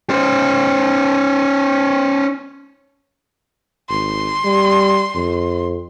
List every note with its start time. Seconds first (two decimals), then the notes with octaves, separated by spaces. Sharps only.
0.10 C#4 C5
3.89 G#1 C6
4.45 G3
5.15 F2